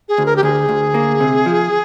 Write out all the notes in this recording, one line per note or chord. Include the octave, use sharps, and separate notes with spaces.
G#4
D2
A#4
G4
D2 G#4
D2
A#3
C3
F3